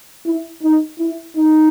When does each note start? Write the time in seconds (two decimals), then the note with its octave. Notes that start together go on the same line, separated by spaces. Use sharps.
0.26 E4
0.63 D#4
0.99 E4
1.36 D#4